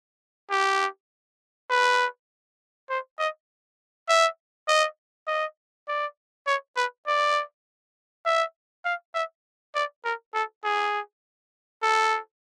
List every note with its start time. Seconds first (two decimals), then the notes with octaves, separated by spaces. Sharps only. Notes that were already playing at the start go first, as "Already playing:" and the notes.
0.51 G4
1.70 B4
2.90 C5
3.19 D#5
4.09 E5
4.68 D#5
5.27 D#5
5.88 D5
6.47 C#5
6.76 B4
7.07 D5
8.25 E5
8.85 F5
9.14 E5
9.75 D5
10.04 A#4
10.34 A4
10.64 G#4
11.83 A4